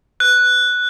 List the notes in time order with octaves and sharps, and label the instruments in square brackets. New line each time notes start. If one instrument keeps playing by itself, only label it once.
[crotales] F#6